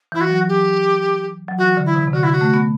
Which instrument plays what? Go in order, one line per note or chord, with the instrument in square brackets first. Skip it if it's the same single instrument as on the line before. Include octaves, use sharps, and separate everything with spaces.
[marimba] E3 [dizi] E4
[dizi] F#4
[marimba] F#3
[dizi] G4
[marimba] F#3
[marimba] E3 [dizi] F#4
[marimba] D3
[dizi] E4
[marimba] C3
C3
[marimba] D3 [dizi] F#4
[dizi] E4
F#4
[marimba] A3
B3